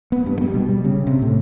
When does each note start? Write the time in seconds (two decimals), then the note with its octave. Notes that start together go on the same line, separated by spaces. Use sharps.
0.12 B3
0.26 G2
0.41 G3
0.54 B2
0.69 G3
0.84 C#3
1.07 C3
1.22 A2